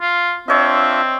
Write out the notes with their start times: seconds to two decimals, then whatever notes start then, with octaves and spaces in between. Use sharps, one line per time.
0.01 F4
0.48 C4 D4 F4 C#5 D#5 E5